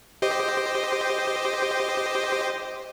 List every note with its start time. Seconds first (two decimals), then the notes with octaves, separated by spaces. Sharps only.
0.22 G4 C5 D#5